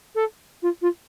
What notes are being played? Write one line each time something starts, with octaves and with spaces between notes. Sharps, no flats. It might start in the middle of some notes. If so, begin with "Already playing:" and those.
A4
F4
F4